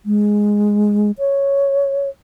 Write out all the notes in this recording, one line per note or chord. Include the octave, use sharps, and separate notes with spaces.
G#3
C#5